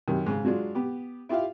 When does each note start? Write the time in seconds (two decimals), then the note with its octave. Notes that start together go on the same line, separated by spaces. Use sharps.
0.08 F#2 C3 D#3
0.26 G#2 C#3
0.45 F#3 G#3 D4 F4
0.75 B3 G4
1.29 E4 F4 G4 E5 F5